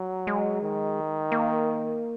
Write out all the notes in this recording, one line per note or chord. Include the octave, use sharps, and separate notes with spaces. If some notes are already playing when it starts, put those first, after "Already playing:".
Already playing: F#3
G#3
D#3
A#3